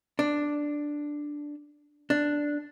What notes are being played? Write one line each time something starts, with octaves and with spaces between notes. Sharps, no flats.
D4
D4